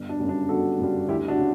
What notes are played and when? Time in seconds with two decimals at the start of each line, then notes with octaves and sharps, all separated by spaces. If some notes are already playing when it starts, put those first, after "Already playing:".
Already playing: G1
0.09 D4
0.19 F#2 C#3 G3
0.29 D4
0.49 G1 F#4 A4
0.79 F#2 C#3 G3
1.08 D2 E4 G4
1.28 D4 F#4
1.38 C#3